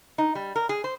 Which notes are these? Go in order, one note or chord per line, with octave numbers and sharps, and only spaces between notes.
D#4
G3
A#4
G#4
C5